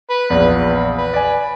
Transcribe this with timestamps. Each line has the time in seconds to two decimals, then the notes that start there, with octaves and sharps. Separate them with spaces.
0.10 B4
0.30 A#1 E2 B4
0.98 B4
1.14 D5 G#5